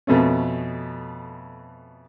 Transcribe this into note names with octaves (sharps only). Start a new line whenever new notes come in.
F2 B2 A3 C#4